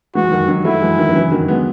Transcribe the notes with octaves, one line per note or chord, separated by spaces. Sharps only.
E3 G#3 F#4
E3
D#3 F#3
D#3 F#3
F#3 A3 E4
E3 G#3
D#3 F#3
F#3
C#3 E3
D#3 F#3
G#3 B3